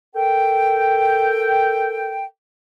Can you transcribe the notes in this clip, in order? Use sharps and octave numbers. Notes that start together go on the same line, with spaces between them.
A4 A#4 G5